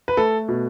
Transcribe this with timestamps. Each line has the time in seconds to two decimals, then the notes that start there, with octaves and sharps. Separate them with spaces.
0.08 B4
0.17 A3 A4
0.48 B2